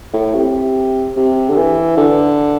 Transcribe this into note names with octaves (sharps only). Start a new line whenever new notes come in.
A2
C3
C3
D3
E3
D3